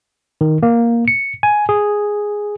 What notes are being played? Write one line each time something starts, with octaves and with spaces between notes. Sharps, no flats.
D#3
A#3
C#7
G#5
G#4